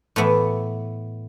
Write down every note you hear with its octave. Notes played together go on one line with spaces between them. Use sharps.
A2 E3 B3 E4